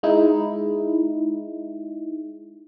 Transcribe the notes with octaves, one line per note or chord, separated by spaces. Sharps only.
G#3 D#4 E4